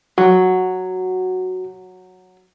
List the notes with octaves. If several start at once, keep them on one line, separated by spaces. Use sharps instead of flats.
F#3 F#4